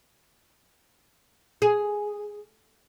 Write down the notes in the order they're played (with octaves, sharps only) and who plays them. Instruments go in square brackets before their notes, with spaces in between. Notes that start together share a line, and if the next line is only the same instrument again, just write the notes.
[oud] G#4